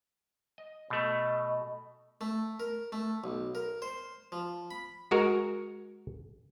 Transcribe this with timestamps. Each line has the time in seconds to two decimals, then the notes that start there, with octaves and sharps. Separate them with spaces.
0.58 D#5
0.90 B2 A3 D#5
2.21 A3
2.60 A#4
2.92 A3
3.24 B1
3.55 A#4
3.82 C5
4.32 F3
4.71 B5
5.11 G#3 F#4 A#4